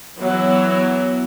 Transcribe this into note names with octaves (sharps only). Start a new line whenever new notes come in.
E3 F#3 B3 E4